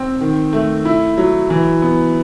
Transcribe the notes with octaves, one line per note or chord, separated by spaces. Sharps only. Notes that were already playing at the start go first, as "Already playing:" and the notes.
Already playing: C4
D#3
A3
E4
F#3
E3
B3